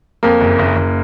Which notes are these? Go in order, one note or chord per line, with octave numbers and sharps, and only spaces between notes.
F2 A#3
F#1
F#1
F#1